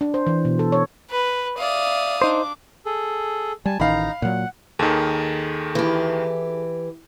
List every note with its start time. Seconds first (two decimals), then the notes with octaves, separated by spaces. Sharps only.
0.01 D4
0.14 C5
0.27 E3
0.45 B2
0.59 A4
0.72 C#5
1.11 B4
1.58 D5 E5 F5 D#6
2.22 D4 D#4 C5 D6
2.86 G#4 A4
3.65 G3 G#5 A5
3.80 A1 D#3 D#4 F5 A#5 B5
4.22 A#2 F#3 F#5
4.79 D#2 D#3 G#4 A4
5.75 E3 G4